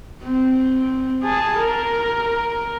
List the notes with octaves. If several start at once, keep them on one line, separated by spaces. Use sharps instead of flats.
C4
G#4 A5
A#4